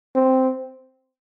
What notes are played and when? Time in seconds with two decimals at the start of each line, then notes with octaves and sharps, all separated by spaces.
0.15 C4